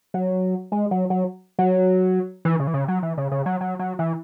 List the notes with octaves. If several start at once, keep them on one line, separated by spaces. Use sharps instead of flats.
F#3
G#3
F#3
F#3
F#3
E3
C#3
E3
C#3
F#3
E3
C#3
C#3
F#3
F#3
F#3
E3